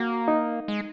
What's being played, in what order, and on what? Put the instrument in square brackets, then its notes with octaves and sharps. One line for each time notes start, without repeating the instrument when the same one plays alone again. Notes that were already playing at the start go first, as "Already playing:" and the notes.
Already playing: [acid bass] A#3 [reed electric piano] F#4
[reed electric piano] D#4
[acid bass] G#3